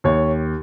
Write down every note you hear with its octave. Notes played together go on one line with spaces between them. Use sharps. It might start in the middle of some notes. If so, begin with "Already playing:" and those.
D#2 C#5